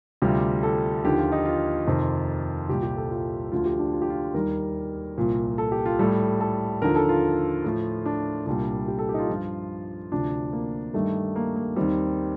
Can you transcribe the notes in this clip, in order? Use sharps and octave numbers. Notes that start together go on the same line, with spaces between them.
D2 C3 G3 F4
A4
D#2 D3 F3 G4
F4
D#4
F4
F2 C3 D#3
C2 A#2 G3 G4
G4
A4
F4
D2 D3 F3 F4
G4
D4
F4
G4
F4
D#2 D#3 G3 A#4
C2 A#2 F3
A4
G4
F4
A2 G3 A4
A4
D#2 D3 F3 A#4
A4
F4
A2 F3
D4
C2 A#2 G3 D4
G4
A4
G4
D#4
F4
G2 F3
D2 C3 F3 D4
A#3
G2 D#3 G3 A3
A#3
A#3
D#2 D#3 G3 C4